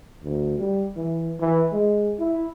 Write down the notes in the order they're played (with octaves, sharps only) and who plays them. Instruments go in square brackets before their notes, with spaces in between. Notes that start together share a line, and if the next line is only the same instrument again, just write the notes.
[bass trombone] D2
G3
E3
E3
G#3
E4